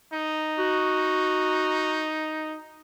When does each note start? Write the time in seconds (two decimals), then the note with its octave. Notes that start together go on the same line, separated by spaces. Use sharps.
0.13 D#4
0.59 F#4